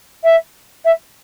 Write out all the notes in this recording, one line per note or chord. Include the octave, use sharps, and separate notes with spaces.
E5
E5